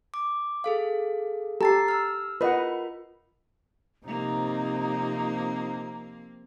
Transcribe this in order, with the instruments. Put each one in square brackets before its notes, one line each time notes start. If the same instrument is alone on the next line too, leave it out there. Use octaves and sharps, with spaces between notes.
[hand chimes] D6
G#4 A4 F5
[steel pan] G4 A4 [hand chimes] A#5 A6 C7
[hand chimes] E6 F6
[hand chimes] F4 A#4 B5 [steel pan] B4 D#5 F#5
[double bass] C3 D#4 [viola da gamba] F3 A#3 C4 [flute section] A#5